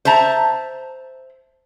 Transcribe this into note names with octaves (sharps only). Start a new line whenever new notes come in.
C5 E5 A5 A#5